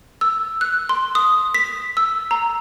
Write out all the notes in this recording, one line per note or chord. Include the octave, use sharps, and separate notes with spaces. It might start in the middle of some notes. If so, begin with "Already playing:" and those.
E6
F#6
C6
D#6
B6
E6
A#5